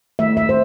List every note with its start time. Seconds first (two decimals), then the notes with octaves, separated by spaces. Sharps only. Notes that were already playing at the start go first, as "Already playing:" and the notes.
0.19 D#3 A3 E5
0.37 E5
0.49 C5